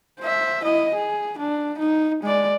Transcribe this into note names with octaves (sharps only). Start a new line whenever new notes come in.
C5 E5
E4 D#5
G#4
D4
D#4
G#3 D5